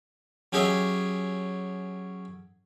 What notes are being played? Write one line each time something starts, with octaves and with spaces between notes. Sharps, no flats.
F#3 C#4 G4 G#4 D#5 E5